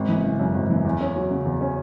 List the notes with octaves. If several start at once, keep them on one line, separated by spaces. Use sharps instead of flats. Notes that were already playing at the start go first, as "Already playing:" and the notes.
Already playing: G#1
E3
C#3
F#2
G#1
E3
E2
C#4
F#3
C#3
E2
C#4